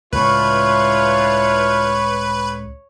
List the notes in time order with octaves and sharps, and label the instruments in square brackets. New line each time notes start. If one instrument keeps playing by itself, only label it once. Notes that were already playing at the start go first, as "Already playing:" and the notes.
[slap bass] C#2 A2 [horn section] D4 E4 F4 [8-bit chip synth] B4 [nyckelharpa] C#5 C#6